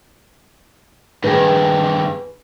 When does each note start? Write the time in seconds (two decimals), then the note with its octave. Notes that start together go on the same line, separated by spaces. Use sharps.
1.24 G2 D#3 G#4 B4